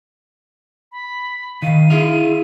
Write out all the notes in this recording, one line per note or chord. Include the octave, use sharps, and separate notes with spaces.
B5
D#3 F5 D#7
E4 G#4 E5 F5